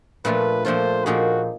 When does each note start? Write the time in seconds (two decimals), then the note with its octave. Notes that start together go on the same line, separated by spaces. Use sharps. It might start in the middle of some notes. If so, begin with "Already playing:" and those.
0.25 A#2 F3 A3 D4 F4 B4
0.65 A#2 F3 A3 D4 F4 C5
1.05 A#2 F3 A#3 D#4 F#4 G#4